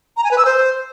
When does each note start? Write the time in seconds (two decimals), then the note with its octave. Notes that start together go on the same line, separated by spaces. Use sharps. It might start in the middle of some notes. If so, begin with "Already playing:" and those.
0.17 A#5
0.24 G#5
0.31 B4
0.38 E6
0.45 C5